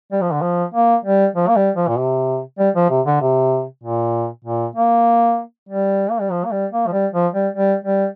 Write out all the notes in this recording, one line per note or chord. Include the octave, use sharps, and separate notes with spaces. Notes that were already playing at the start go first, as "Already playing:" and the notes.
G3
F3
D3
F3
A#3
G3
F3
A#3
G3
F3
A#2
C3
G3
F3
C3
D3
C3
A#2
A#2
A#3
G3
A#3
G3
F3
A#3
G3
A#3
F3
G3
F3
G3
G3
G3